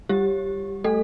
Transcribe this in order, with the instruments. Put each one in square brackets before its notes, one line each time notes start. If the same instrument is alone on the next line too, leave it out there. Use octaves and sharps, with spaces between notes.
[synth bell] G3 G4
A3 A4